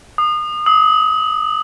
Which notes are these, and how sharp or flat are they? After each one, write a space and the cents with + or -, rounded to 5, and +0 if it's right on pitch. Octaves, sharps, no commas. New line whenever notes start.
D#6 -30
D#6 +35